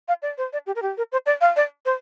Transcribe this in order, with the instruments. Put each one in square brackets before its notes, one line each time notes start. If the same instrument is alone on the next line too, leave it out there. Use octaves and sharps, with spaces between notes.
[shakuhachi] F5
D5
C5
D5
G4
A#4
G4
A#4
C5
D5
F5
D5
C5